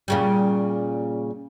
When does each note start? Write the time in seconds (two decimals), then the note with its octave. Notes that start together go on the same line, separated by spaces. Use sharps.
0.08 A#2 C#3 G3